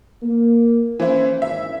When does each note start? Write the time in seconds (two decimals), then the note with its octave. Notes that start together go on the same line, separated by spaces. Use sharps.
0.22 A#3
1.00 E3 C#4 E4 C5
1.42 G#1 E5